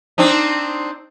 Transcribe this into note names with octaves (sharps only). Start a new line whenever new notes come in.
C4 D4 D#4